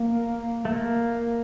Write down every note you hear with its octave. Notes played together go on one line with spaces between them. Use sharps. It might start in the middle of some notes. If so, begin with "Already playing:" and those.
Already playing: A#3
A3
A#3